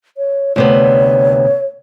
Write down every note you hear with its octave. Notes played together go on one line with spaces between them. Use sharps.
C#5
D2 C3 B3 C#5